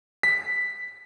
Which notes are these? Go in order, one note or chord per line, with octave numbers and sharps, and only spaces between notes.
B6